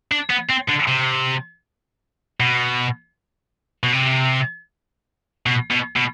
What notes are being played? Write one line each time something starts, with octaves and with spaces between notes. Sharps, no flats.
D4
B3
C4
D3
C3
B2
B2
C3
B2
B2
B2